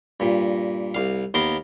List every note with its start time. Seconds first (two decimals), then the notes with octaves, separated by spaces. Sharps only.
0.20 G2 A#2
0.94 C2 F5
1.34 D#2 B3 A#4 C6